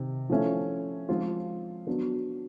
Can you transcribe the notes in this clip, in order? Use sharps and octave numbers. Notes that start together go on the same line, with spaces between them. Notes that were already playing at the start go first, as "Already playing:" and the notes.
Already playing: C3 D#3
F3 A3 C#4 E4
F3 G#3 C4 F4
F#3 B3 D4